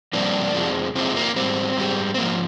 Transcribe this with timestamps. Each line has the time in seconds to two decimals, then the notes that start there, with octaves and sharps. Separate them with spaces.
0.13 F2 C3 G3 A#3 D4
0.54 F2 C3 F3 G#3
0.95 F2 C3 F3 G#3 C4
1.16 A#3
1.36 G#2 G3 C4
1.77 G#2 G3
2.14 C4
2.18 G#2 F3 A#3